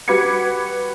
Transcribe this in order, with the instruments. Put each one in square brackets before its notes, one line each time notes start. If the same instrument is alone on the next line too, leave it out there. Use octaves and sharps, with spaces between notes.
[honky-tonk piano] G3 F#4 B4 D6 G#6 C#7